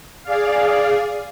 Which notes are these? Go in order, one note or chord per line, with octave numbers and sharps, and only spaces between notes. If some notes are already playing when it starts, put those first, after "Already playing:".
G#4 D5 F5